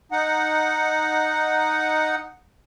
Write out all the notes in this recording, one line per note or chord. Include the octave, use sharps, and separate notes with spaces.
D#4 F#5